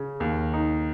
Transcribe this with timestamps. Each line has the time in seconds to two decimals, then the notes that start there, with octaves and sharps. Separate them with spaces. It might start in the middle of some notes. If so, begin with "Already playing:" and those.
Already playing: C#3
0.20 D#2
0.54 D#4